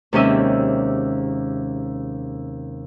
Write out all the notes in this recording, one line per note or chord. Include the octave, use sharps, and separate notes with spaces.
D#2 C3 G#3 C#4 D#5 E5